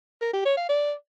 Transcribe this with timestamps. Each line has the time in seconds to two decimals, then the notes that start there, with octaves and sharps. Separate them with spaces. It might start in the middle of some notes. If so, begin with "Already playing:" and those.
0.21 A#4
0.33 G4
0.45 C#5
0.57 F5
0.69 D5